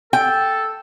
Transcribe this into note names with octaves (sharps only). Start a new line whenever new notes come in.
A4 G5